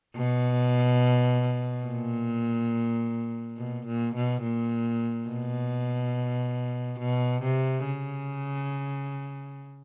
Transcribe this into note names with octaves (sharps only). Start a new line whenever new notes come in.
B2
A#2
B2
A#2
B2
A#2
B2
B2
C3
C#3